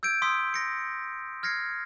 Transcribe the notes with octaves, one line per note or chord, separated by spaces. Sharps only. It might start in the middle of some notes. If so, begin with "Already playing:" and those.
E6 G6 G#6 D7
C6 D#6 E6 B6
A#6 C#7
F6 G#6 A#6 C7 C#7